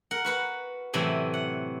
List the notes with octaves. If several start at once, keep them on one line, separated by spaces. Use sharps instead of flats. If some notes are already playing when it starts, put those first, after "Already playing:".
A#4 F#5
F#4 B4 F#5
A2 C3 E3 F#3
F#5